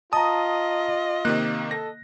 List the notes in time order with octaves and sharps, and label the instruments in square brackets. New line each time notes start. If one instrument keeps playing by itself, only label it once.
[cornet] F4 [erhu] D#5 [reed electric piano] A5 A#5 [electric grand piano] D#6
[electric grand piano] C3 D#3 A#3 [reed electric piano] F#6
[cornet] A4 [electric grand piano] A#6